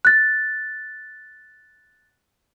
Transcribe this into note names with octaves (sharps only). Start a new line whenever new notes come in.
F#6 A6